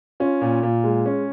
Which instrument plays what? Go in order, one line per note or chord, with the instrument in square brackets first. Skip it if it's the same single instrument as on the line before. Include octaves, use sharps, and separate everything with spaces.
[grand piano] C#4 F4
A#2
A#2
G#3
C#4